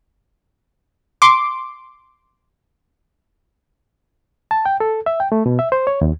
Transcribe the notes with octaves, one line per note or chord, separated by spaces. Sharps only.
C6 D6
A5
G5
A4
E5
G5
A3
B2
E5
C5
C#5
D#2